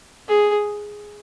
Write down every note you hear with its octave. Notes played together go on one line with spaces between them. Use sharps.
G#4